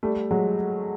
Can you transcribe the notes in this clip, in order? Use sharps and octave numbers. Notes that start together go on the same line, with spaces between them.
G3 A3
F#3 G#3